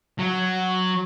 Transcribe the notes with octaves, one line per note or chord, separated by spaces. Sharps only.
F#3